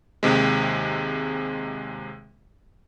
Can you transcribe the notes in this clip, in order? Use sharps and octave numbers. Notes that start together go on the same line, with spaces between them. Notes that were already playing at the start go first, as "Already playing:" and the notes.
D#2 C3 G#3